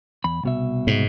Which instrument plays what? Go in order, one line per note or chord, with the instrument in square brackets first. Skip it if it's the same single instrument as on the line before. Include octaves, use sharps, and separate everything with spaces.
[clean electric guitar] E2 B5
C2 B2 E5
[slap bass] G#2